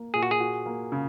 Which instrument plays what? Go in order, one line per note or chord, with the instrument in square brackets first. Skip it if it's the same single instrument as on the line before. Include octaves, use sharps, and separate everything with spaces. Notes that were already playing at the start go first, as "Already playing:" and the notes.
Already playing: [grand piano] A#3
[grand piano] A#2 [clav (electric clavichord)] G#4
[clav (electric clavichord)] F#4
G#4
[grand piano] F#4
A#3
C#3